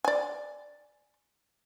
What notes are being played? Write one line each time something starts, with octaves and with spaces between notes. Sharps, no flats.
D5 G#5